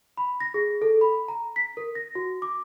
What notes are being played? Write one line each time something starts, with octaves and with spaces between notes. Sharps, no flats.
B5
A#6
G#4
A4
B5
A#5
B6
A#4
A#6
F#4
D6